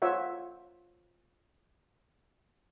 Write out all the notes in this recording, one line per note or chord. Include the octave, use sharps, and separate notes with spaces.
F4 C5 C#5 E5 F#5